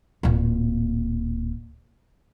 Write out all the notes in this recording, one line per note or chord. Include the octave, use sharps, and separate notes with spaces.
D1 A#2